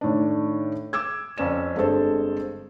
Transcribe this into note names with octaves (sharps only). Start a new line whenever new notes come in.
A2 D#3 D4
D6 E6 G#6
F2 C#4 D5 E7
G1 G2 G#3 C4 A4 C5